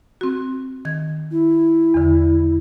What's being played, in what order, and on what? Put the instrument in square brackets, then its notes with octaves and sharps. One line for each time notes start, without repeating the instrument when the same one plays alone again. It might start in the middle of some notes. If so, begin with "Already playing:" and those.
[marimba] C4 F#4
D#3 G#6
[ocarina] E4
[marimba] E2 D3